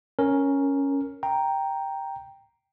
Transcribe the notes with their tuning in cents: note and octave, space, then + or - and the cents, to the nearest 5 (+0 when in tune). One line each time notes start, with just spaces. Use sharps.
C#4 +0 A#4 +0
G5 +0 A#5 +0